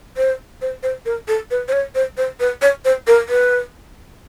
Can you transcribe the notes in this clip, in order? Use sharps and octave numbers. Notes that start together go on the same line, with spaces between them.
C5
C5
C5
A#4
A4
B4
C5
C#5
C5
C5
B4
C#5
C5
A#4
B4